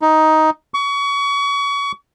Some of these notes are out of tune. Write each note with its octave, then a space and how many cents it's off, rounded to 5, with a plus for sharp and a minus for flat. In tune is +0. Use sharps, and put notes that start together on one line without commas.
D#4 +10
C#6 +30